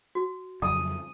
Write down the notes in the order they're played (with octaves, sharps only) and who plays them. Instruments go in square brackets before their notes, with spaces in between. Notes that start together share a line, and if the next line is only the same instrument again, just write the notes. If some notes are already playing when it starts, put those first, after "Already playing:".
[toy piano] F#4
[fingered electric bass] F2 C#3 F#3 [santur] D#6